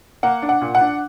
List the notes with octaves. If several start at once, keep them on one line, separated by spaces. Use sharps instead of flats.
A#3 F#5
D4
F#5
A#2
F#5
D4